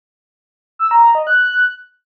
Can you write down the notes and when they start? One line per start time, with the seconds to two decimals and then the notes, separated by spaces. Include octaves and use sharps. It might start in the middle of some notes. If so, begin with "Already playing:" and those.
0.79 E6
0.91 A#5
1.03 A#5
1.15 D#5
1.27 F#6